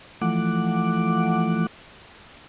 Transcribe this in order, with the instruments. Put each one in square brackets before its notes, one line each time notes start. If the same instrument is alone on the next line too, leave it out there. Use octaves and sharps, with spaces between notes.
[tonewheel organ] E3 F3 A3 F#5 D6